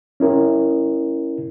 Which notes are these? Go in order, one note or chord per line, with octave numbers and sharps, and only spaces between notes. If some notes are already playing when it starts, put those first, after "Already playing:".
C#4 E4 A#4